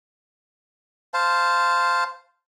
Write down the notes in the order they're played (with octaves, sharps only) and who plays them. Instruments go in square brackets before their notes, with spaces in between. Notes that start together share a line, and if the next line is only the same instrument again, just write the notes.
[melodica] C5 F5 A5